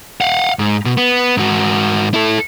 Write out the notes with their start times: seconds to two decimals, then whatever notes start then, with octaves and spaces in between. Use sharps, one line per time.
0.21 F5 F#5
0.59 G#2
0.85 B2
0.97 B3
1.37 G#2 F#4
2.14 E4 A4